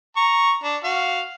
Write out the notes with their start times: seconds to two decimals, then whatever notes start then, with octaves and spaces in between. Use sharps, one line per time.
0.17 A#5 C#6
0.64 D4
0.84 F#4 F5